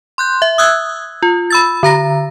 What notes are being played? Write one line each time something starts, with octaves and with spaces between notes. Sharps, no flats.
C6 F#6 G6
E5
D#6 E6 F#6 G#6
F4
B5 E6 A6
D3 A#5 A#6